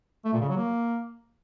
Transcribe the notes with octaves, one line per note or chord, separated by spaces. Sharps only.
A3
A#2
C#3
F#3
A#3